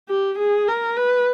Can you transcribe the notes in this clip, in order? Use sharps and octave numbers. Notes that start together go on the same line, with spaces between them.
G4
G#4
A#4
B4